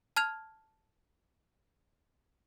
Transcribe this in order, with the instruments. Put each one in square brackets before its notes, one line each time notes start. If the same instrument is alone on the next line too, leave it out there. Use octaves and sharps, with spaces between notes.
[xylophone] A5 F6 G#6 F7